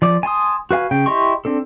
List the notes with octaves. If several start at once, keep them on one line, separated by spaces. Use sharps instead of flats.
F3 D5 D6
G#5 A5 C6 D#6
F#4 B4 F5 G#5
C#3 G5
E4 G4 D#5 C6 C#6
C4 D4 A4